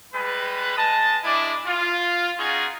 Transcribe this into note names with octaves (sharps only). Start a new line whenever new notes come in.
G3 G#3 B4
G#3 D#5 A5
G#3 D4 E4 D5 D6
F4
C#4 D#4 F4 F#4 G#4